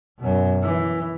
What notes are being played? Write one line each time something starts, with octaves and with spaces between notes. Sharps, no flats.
F#2 B2
E3